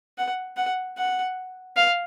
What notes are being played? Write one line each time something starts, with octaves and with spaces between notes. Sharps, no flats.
F#5
F#5
F#5
F5